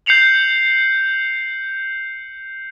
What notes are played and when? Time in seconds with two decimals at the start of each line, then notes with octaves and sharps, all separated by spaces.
0.06 G6 C7 C#7 F7 F#7